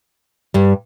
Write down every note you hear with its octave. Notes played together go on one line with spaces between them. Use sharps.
G2 G3